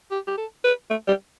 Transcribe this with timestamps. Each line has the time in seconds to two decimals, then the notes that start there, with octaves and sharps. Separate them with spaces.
0.11 G4
0.27 G4
0.37 A4
0.64 B4
0.90 A3
1.07 G3